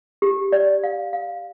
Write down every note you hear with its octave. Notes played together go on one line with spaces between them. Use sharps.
G4
D5
F5
F5